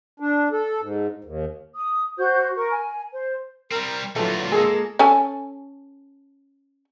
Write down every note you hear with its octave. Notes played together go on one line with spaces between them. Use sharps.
D4
A4
G#2
D#2
D#6
F#4 C5 G6
A#4 C#6
G#5
C5
G3 C4 A#4
A#2 D3 E3 F#3 A3 F4 A4
G#3 A#3 G#4 A4
C#4 A4 G#5